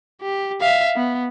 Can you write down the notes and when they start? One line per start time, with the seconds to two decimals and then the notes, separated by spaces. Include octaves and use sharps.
0.22 G4
0.61 E5 F5
0.96 B3